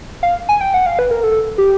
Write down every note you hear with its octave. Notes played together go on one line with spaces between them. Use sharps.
F5
G#5
G5
F#5
F5
B4
A#4
A4
G4